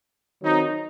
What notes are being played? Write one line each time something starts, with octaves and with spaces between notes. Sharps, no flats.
D#3 F#3 C4 D#4